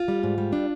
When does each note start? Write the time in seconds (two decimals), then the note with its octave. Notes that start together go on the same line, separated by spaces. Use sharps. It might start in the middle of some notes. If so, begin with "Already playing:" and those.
Already playing: F4
0.08 G3
0.23 G#2
0.38 G3
0.53 D4